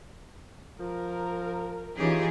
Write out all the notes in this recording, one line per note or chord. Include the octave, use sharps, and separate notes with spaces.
F3 A#4
E3 C#4 D#4 F4 G4 G#4